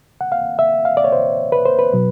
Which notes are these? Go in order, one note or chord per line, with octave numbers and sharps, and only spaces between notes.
F#5
F5
E5
F5
D5
C#5
C5
B4
C5
B4
B2 F#3